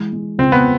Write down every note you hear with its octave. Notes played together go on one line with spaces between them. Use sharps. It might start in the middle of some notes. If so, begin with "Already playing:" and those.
Already playing: E3 G#3
G#3
C#2 C4
B3